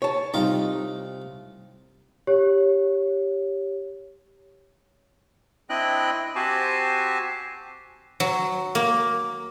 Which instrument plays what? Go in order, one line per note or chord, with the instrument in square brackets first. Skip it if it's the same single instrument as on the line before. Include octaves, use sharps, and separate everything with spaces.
[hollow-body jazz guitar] C#5 A5
[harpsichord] C2 F4 G5 [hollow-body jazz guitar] D#4
[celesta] G4 C#5
[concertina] C4 D4 E4 D#5 G5 F#6
C4 F#4 G4 C5 G#5 A5
[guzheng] F#3
A#3